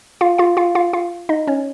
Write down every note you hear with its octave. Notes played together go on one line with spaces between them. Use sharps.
F4 F5
F4 F5
F4 F5
F4 F5
F4 F5
D#4 D#5
C#4 C#5